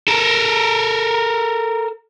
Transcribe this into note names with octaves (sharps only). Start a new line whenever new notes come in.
A4 A#4